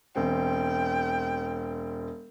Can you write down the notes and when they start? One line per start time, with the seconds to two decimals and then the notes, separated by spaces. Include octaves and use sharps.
0.16 E1 C4 G5